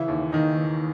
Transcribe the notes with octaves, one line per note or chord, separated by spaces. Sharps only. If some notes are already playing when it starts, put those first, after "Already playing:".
Already playing: C#3 E3 E4
D#2
D#2 D#3 D#4
E3